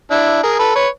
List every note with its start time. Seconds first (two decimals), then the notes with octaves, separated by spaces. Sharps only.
0.10 D4 E4
0.43 G#4 A#4
0.59 A4 B4
0.75 B4 C#5